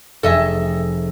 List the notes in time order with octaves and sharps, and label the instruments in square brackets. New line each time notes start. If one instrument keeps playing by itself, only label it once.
[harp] F1 G#4 [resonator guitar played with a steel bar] A4 D#5 E5